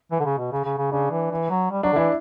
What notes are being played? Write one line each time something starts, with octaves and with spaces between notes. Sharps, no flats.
E3
D3
C#3
B2
C#3
C#3
C#3
C#3 D4
E3
E3
F#3
G3
F#3 D4
D3
E3 E4